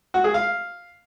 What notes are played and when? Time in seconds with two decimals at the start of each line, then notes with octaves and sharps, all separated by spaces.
0.14 F#4
0.24 G#4
0.34 F5